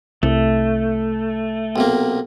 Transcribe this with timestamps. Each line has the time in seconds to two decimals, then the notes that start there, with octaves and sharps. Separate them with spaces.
0.23 C2 A3
1.76 B1 C3 A#3